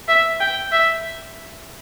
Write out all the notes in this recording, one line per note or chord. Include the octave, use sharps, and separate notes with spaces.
E5
G5
E5